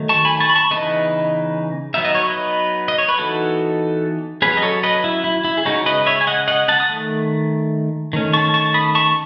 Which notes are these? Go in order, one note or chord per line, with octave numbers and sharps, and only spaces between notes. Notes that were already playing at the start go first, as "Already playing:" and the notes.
Already playing: D#3 F#3 A3 D#4
A5 C#6
G#5 B5
A5 C#6
B5
A5 C#6
C#3 E3 B3 D#4 B4 D#5
F#3 B3 D#4 E5
D#5
C#5
B4 D#5
D#5
C#5
B4
E3 B3 D#4 F#4 A4
F#3 C#4 G#4 B4
D#5
A4 C#5
B4 D#5
E4
E4
E4
G#4
C#3 G#3 C#4 D#4 F#4
B4 D#5
C#5 E5
G#5
D#5 F#5
D#5 F#5
F#5 A5
D#6
D#3 A3
D#3 A3 C#4
A5 C#6
A5 C#6
B5 D#6
A5 C#6